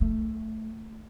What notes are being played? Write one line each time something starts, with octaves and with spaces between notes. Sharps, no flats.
A3